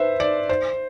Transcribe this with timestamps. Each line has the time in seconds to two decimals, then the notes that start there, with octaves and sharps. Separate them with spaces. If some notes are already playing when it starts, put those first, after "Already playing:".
Already playing: B4 C5 E5
0.20 D5
0.49 C5